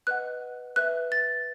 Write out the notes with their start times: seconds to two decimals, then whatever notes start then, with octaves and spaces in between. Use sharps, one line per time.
0.07 B4 D#5 F#5 F#6
0.76 B4 E5 F#6
1.12 A6